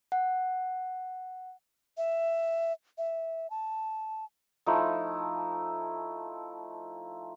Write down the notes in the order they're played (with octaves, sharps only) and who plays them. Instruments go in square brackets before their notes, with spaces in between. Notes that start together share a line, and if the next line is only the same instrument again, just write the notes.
[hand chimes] F#5
[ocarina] E5
E5
A5
[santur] F3 A3 D#4 E4